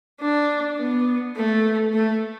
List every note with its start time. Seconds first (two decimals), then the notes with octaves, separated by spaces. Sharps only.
0.21 D4
0.78 B3
1.36 A3
1.94 A3